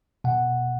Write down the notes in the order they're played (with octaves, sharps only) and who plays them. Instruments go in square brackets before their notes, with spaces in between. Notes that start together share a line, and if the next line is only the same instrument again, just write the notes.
[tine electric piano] B2 F#5